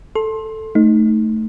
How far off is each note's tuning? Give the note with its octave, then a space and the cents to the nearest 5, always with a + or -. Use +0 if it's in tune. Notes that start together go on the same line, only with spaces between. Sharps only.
A4 +0 C6 +20
A3 +0 D#4 +0